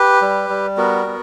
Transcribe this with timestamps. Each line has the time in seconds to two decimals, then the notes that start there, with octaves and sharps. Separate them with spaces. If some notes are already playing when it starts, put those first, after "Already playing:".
Already playing: G4 B4
0.22 G3
0.49 G3
0.77 B3 F#4 A#4
1.06 B3